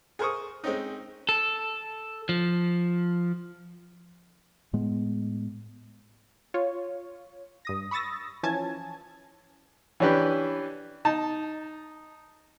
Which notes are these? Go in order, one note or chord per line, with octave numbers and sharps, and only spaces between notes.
G#4 A#4 C5 C#6 D#6
G#3 C4 C#4 D#4
A4
F3
A2 G#3 B3
F4 C#5
G2 D#6 A#6
B5 C#6 D#6 E6 A6 A#6
E3 F3 C#4 G#5 A5 G#6
E3 C#4 D4 G4 B4
D#4 A5